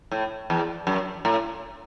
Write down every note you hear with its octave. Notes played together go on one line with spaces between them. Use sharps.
A2
E2
F#2
A2